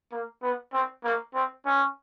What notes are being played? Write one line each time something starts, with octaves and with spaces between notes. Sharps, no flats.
A#3
B3
C4
A#3
C4
C#4